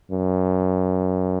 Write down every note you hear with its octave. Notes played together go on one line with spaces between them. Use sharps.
F#2